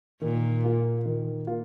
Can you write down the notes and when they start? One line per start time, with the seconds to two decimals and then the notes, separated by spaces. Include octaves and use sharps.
0.21 A#2 D#3
0.64 A#3 F4
1.06 D#3
1.47 A#3 F4